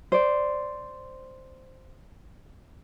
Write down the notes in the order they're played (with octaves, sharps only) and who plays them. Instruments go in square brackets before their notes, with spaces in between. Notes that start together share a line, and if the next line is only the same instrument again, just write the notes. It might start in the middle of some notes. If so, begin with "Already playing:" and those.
[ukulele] C5 D5